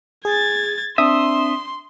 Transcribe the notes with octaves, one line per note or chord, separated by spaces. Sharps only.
G#4 G#6 A6
C4 D4 E5 C6 D#6